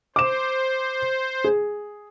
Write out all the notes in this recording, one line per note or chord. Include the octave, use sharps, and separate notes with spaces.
C5 D6 E7
G#4